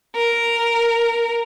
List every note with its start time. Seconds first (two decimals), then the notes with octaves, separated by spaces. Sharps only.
0.14 A#4